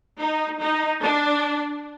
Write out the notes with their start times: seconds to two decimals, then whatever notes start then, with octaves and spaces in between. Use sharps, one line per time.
0.20 D#4
0.60 D#4
1.02 D4